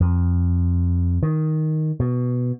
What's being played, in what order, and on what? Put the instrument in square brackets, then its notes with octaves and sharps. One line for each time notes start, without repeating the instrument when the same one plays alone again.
[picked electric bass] F2
D#3
B2